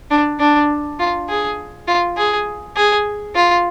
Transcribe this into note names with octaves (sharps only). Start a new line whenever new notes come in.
D4
D4
F4
G#4
F4
G#4
G#4
F4